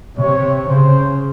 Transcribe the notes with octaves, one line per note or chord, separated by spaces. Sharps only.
C3 C#5
C#3 C5